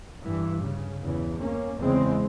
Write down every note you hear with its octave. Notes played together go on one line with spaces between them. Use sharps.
G2 E3
C#3
E2 C#3 E3
A#3 C#4
E2 C#3 G#3 C4